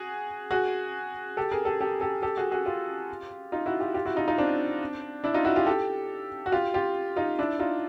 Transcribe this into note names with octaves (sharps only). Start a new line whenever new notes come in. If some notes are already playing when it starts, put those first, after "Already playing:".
Already playing: F#4 G#4
F#4 G#4
G4 A4
G#4 A#4
G4 A4
G4 A4
G4 A4
G4 A4
F#4 G#4
F#4 G#4
F4 G4
D#4 F4
E4 F#4
F4 G4
F4 G4
E4 F#4
D#4 F4
D#4 F4
C4 D4
D4 E4
D#4 F4
E4 F#4
F4 G4
G4 A4
F#4
F4 G4
F4 G4
D#4 F4
D4 E4
D#4 F4